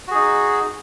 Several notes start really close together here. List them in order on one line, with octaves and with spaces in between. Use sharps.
F#4 G#4 D#4